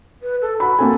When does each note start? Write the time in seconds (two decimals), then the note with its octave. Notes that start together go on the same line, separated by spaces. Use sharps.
0.22 B4
0.41 A4
0.60 F#4 B5
0.79 A#3 C4 A4 G#5